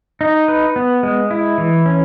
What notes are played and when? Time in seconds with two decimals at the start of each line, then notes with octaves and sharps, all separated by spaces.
0.21 D#4
0.48 B4
0.76 B3
1.03 G#3
1.31 E4
1.58 E3
1.86 C#4